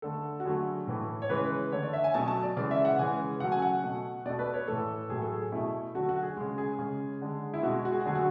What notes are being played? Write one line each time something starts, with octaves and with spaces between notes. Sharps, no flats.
D3 A3 A4
F#4
D3 F#3 A3 G#4
A2 E3 A3
C#5
C#3 E3 G#3 B4
D3 A3 C#5
D5
E5
G#5
B2 F#3 A3 A5
A5
D5
C#3 E3 G#3 D5
E5
F#5
C#3 E3 G#3 G#5
C#3 F#3 A3 F#5
G#5
F#5
B2 A3
B2 A3 D5
B4
C#5
A2 E3 A3 A4
A2 F#3 A3 G#4
A4
G#4
B2 A3 E4
D3 F#3 A3 F#4
F#4
G#4
C#3 G#3
G#4
C#3 G#3
D3 G#3
E4
B2 G#3 F#4
F#4
G#4
F#4
D3 F#3 A3 G#4
F#4